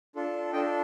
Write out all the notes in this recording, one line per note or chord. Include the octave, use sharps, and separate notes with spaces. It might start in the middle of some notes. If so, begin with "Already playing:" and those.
D4 F4 A4
D4 F4 A4 D#5 G5